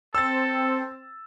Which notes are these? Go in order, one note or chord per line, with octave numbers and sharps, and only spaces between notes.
C4 A4 E6 A6